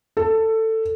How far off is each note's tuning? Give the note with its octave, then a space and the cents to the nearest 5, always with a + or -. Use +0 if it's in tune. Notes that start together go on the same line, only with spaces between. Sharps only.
A4 +15